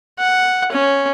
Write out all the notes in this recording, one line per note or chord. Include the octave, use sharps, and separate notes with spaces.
F#5
C#4